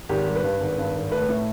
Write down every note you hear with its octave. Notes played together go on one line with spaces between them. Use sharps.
G#1 G4
G3
B4
G2
G#1
G2
G#1
A3 B4
A2